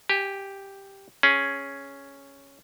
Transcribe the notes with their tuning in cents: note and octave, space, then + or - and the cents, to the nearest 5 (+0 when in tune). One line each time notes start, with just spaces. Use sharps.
G4 +0 G#5 -20
C#4 +0 G#4 +0